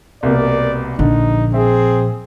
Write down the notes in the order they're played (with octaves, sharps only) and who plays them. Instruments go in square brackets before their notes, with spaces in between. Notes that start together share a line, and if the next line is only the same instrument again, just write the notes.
[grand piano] C2 B2 A#3 [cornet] D5
[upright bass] A#1 [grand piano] D3 [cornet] D#4
[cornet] C4 [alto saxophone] G#4 [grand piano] E5